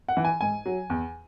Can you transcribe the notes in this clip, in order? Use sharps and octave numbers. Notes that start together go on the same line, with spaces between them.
F#5
E3
G#5
G#2 G#5
F#3
E2